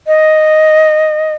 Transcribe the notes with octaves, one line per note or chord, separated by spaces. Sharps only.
D#5